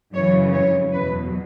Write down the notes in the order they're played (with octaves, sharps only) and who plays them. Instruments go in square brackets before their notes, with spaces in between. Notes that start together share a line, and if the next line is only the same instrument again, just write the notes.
[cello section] F#2 C#3 E3 G#3 C#5
C#5
E2 B2 F#3 B4